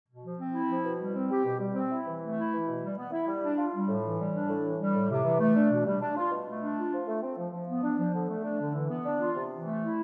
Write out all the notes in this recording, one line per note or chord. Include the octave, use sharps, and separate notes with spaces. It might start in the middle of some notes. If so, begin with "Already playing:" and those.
B2
F3
C4
E4
F3
B2
G3
C4
G4
B2
G3
C4
E4
E3
A3
E4
E3
B2
G3
B3
E4
G3
D4
F4
G3
A2
E3
G3
D4
A2
E3
G3
A2
C3
E3
A3
D4
B2
G3
D4
F4
B2
A3
D4
F4
F3
A3
C4
F3
F3
B3
D4
F3
D3
A3
D4
D3
E3
B3
D4
F4
C3
E3
A3
E4